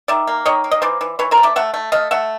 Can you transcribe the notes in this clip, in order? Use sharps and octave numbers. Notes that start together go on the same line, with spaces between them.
D#3 D5 E5
A#3
D#3 C#5 D#5
A#3
D#5
E3 C5 D5
E3
E3 B4 C#5
A#4 C5
A3
D5 E5
A3 E5 F#5
A3
A3 D#5 F5
A3 E5 F#5